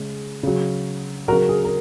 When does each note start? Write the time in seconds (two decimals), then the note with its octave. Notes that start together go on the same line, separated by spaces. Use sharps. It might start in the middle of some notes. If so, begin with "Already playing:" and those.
Already playing: C#3 G#3
0.43 C#3 F#3
1.28 F#3 F#4 A#4
1.32 C#3
1.49 G#4
1.65 A#4